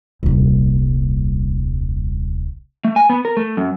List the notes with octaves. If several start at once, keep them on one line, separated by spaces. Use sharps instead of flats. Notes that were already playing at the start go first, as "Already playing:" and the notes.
D#1 C2
A3
G#5
B3
A#4
A3
F#2